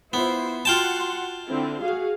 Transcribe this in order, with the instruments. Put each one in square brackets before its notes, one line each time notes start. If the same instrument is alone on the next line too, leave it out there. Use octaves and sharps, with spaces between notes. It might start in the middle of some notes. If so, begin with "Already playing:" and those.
[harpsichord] B3 [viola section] E4 F4 C5
[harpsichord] F4 G5 A5 [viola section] F#4 F#5 C6
[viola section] D3 C4 E4
F#4 G#4 F5